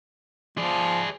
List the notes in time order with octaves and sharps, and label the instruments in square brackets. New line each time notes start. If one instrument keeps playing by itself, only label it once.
[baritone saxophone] F3 [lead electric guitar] G#4 D5